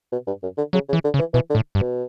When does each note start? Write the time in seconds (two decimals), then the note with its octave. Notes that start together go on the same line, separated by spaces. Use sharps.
0.12 B2
0.27 G2
0.43 F#2
0.58 D3
0.73 C#3 F#3
0.89 C#3
0.93 E3
1.04 D3
1.14 C#3
1.19 E3
1.34 B2 E3
1.50 D3
1.55 A2
1.75 G2
1.81 B2